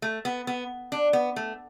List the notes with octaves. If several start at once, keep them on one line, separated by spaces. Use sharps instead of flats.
A3
B3
B3
D4
B3
A3